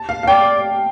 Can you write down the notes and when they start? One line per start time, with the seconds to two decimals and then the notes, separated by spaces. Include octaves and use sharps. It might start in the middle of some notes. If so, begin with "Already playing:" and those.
Already playing: A5
0.09 F5
0.23 F5
0.27 D5 G5